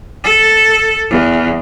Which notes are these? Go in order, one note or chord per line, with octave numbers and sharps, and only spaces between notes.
A4
E2